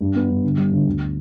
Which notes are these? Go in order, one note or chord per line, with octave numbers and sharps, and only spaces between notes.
G2
B3
G2
D3
G3
D3
D2